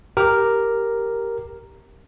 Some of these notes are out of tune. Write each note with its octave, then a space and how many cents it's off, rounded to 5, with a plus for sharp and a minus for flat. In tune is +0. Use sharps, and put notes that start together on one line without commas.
G4 +0 A#4 +0